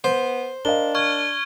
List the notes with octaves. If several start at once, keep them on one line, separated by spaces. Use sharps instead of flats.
B3 C5
D4 A#4 D#5 F5 G7
C#6 F6 G#6